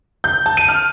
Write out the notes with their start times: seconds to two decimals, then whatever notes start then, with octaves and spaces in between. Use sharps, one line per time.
0.24 G6
0.46 A5
0.57 D#7
0.68 F6